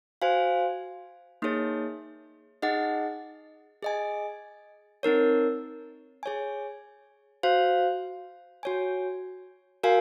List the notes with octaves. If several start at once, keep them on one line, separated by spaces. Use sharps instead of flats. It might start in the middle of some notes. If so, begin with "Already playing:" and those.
F#4 C5 F5 G#5
A#3 D#4 G#4 C#5
D#4 G#4 D#5 F#5
G#4 D#5 G#5
C4 D#4 A#4 C#5
G#4 C#5 G#5
F#4 C5 F5
F#4 C#5 G#5
F#4 A#4 F5 G#5